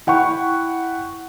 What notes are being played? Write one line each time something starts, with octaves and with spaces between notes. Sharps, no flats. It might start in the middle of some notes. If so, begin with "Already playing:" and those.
E4 F#5 G5 C#6